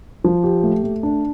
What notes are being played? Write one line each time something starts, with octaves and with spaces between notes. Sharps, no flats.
F3
G4
A3
A3
D4